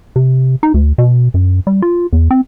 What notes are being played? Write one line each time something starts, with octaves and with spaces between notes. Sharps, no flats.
C3
D#4
D2
B2
F#2
G3
F4
E2
C4